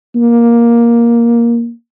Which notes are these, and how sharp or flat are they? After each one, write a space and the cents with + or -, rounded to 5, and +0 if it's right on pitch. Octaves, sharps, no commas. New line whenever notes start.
A#3 +10